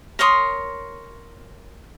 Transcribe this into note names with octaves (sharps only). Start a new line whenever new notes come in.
A#4 C#5 C6 D#6